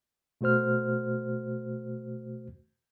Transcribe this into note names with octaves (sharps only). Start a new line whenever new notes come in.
B2 A3 F#4 C5 F6